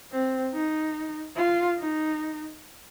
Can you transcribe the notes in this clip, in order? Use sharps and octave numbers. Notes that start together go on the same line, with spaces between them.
C4
D#4
F4
D#4